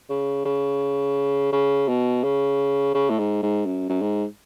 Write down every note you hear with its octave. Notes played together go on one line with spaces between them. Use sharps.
C#3
C#3
C#3
B2
C#3
C#3
A2
G#2
G#2
F#2
F#2
G#2